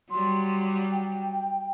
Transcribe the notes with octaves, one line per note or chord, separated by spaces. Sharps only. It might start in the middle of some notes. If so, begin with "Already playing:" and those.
F#3 G3 C6
G5